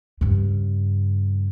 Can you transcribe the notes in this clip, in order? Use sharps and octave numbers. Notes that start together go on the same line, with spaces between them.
G2 C#3